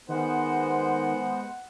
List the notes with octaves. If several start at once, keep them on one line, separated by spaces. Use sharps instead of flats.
D#3 G#3 B3 C5 F#5